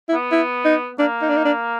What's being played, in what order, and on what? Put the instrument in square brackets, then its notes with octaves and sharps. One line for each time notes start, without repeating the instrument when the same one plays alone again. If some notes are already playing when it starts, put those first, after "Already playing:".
[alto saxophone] E4
[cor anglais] B3
[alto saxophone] E4
D#4
[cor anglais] A#3 [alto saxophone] D4
[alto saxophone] D#4
D4
D#4
D4